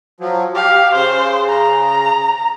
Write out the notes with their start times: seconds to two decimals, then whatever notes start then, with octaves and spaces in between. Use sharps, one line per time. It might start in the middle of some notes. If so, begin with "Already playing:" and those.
0.20 F3 F#3
0.55 G4 F5
0.94 C#3 C5
1.49 A#5